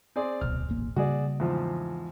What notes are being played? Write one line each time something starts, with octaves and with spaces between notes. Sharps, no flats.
C4 G#4 D5
D1 C2 B2 F6
D#1 A1 A#3
C#3 G3 A#3 F#4 G#4 D5
E2 G#2 F3